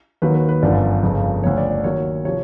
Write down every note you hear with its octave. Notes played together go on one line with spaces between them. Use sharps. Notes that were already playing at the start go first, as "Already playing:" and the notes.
D#2 D#3 F#3 B4
B4
B4
G1 F#2 D3 F3 D5
G1 F2 C#3
D2 C#3 F3 C#5
D5
D5
D#2 D#3 F#3 C#5
C3 F3 C#5